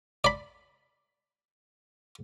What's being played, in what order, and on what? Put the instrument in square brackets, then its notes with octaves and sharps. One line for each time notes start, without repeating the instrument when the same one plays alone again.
[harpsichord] D5 B5